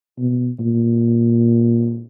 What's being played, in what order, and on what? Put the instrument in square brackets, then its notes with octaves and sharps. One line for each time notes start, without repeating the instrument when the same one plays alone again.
[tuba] B2
A#2